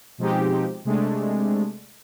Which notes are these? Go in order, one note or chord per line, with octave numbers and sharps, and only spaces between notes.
B2 F3 G#3 C4 D#4 G4
C3 G#3 A3 D4